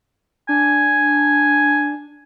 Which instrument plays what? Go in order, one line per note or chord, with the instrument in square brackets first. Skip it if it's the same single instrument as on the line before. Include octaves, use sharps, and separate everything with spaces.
[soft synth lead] D4 [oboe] G#5